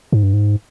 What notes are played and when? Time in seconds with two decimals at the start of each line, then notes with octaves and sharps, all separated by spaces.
0.12 G#2
0.23 G2
0.33 G#2